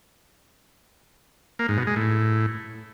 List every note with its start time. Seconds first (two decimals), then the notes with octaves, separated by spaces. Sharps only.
1.59 A#3
1.69 G#2
1.78 B2
1.87 G#3
1.96 A2